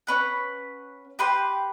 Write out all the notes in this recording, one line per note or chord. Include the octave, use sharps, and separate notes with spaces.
C#4 B4 F#5
G4 B4 C6